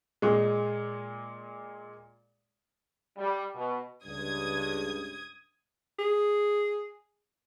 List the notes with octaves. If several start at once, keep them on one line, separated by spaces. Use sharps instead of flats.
A#2 G#3
G3
B2
C#2 G2 D#6 G#6
G#4